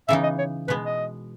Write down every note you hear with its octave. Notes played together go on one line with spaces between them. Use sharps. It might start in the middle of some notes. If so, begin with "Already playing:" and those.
C#3 E3 B3 D#4 E5
D#5
C#5
B2 G#3 B3 B4
D#5